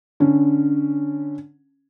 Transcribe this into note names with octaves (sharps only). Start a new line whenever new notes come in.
D3 C#4